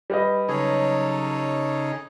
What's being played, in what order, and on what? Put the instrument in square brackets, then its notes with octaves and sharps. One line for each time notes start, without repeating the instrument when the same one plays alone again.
[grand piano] G3 B4 D#5
[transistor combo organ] C#3 D#4 [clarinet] F#3 [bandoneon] G#4 A4 C#5